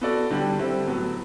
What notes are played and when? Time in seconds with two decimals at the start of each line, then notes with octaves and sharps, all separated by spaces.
0.01 B3 F#4 A4 D5
0.30 D3 G3 D4 G4
0.59 D3 G3 C4 E4
0.87 A2 F#3 B3